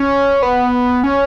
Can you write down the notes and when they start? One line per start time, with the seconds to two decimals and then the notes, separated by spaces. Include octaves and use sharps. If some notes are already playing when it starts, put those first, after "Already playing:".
Already playing: C#4
0.43 B3
1.04 C#4